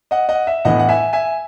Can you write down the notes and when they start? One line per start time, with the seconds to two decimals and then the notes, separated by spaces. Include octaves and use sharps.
0.11 D#5 F#5
0.29 D#5 F#5
0.47 E5
0.65 A2 E3 B3 E4 D#5 F#5
0.79 F#5
0.89 E5 G#5
1.13 E5 G#5